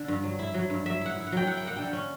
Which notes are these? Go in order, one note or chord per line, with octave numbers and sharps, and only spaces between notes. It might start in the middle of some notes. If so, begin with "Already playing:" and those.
Already playing: D3
G2
F#3
E4
F#3
G2
F#3 E5
E4 F#5
E4
F#5
F#3 G5
E4 F#5
G5
A#3 F#5
D3 G5
F#5
C#4